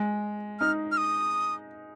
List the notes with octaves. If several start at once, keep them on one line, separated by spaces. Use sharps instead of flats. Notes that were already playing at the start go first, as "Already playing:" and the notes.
Already playing: G#3
D#4 F6
F6
D#6